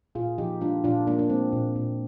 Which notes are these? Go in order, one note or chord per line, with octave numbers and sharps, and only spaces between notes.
A#2 F4 G#4
F3 D#4 G4
G#3 D4 F4
A#2 D4 F4
G#3 A#3 D4
D4
G#3 C4
A#2
A#2